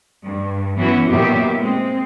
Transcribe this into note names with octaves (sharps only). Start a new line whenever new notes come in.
G2
E3 F#3 B3 C#4 E4 F#4
A#2 D#3 F#3 B3 G4 E5
G#3 C4